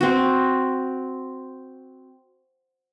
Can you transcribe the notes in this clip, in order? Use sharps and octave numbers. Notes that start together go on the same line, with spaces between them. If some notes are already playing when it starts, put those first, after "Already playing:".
C4 F#4